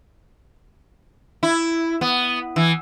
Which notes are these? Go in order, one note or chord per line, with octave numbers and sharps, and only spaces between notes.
E4
B3
E3